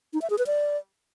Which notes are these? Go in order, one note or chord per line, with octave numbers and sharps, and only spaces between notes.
D#4
E5
G#4
B4
D5